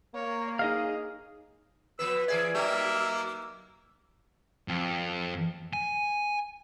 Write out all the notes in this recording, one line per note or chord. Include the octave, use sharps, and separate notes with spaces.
A#3 C#5
D#4 G#4 D#5 F5
F3 B3 B4 E6
E3 G#4 D5 E5
F#3 A#3 D#4 E5
F2
G#5